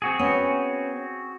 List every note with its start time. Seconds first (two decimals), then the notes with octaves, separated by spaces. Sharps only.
0.02 C4 F#4 G#4
0.19 B3 C#4